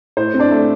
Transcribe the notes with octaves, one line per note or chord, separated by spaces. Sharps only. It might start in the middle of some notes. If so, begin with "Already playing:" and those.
A2 C5
C4
D4 D5
A3